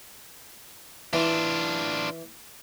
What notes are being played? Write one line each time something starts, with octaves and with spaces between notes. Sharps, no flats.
E3 D4 F4